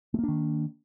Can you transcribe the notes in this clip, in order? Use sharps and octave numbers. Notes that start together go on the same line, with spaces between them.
D#3 A3 A#3 D4